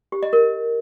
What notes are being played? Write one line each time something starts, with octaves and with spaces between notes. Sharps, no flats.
G4
D#5
A#4